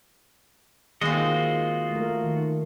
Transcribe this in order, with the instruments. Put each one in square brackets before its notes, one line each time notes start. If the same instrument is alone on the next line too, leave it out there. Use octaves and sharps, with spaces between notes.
[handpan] D#3 A#3 [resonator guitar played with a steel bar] G#3 C4 [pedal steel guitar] F4 F#4 D#5
[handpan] A3 A#4
D#3